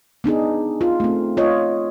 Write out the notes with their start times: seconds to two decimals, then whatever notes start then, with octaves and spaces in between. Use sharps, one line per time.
0.24 B3 D4 D#4 G#4
0.81 F4
1.00 A3 C4
1.37 F4 C#5 D#5